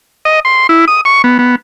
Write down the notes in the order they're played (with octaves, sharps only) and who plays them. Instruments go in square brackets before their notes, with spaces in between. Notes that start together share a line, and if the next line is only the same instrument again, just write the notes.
[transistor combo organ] D#5
C6
E4
D#6
C#6
B3
B3